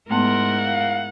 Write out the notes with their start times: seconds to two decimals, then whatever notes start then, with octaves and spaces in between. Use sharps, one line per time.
0.10 G#2 A3 B3 E4 A#4 F#5 C6
0.64 F5